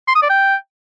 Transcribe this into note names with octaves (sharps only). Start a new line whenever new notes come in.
C6
D#6
D5
G5